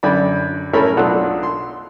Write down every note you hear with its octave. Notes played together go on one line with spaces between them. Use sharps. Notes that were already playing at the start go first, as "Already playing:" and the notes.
F#2 D3 D5 B5
A2 A3 C#4 A#4 C#5 B5
B1 D4 F4 A4 F#5 F#6
C6